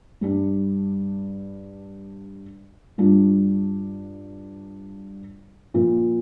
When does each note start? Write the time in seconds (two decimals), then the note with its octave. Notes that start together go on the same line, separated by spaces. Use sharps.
0.21 G2 G3 D4
2.98 G2 G3 D4 F4
5.74 A#2 F3 A#3 F4